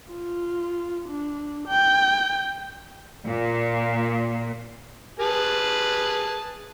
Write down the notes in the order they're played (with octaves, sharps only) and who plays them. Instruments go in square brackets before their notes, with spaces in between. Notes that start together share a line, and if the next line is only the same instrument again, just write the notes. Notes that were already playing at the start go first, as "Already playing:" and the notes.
[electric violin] F4
D4
G5
[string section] A#2
[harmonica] G#4 B4 A5